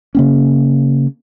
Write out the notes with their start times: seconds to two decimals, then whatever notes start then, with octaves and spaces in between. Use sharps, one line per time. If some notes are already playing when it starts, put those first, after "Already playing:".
0.15 C#3 A#3 C#4